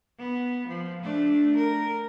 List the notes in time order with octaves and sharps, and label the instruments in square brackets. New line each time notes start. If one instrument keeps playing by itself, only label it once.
[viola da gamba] B3
F3
A3 D4
A#4